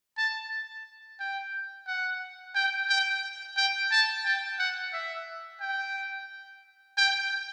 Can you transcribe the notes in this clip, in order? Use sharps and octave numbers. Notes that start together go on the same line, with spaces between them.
A5
G5
F#5
G5
G5
G5
A5
G5
F#5
E5
G5
G5